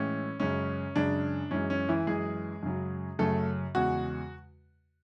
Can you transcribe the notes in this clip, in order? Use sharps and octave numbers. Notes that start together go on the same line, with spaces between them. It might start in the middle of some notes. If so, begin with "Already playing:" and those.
Already playing: A2 E3 G#3 C#4
F#2 C#3 G#3 C#4
F#2 C#3 G#3 D4
F#2 E3 G#3 C#4
C#4
E3 E4
F#2 E3 G#3 G#4
F#2 C#3 F#3
F#2 C#3 F#3 A3 A4
E2 C#3 G#3 F#4 F#5